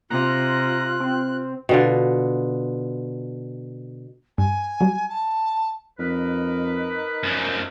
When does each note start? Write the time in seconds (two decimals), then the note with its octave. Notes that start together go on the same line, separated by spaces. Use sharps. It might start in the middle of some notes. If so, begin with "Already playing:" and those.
0.10 C3 F4 A#5 F#6
1.00 C4
1.69 B2 D3 F4
4.38 G2 G#5
4.80 F#3 G3
5.10 A5
5.99 F2 D#4 A#4 B4
7.23 F#2 F3